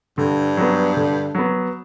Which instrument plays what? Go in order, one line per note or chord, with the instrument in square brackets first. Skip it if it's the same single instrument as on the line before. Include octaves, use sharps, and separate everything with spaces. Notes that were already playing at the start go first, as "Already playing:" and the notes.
[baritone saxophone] G2 [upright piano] D3
[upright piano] F#3 B3
D3
F#3 B3